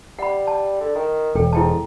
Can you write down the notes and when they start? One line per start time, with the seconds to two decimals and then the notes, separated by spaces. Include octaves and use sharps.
0.19 G3 F#5 B5
0.47 A5
0.81 D3
0.95 D#3
1.35 E1 A4 G5
1.53 G#2 E4 G5 A5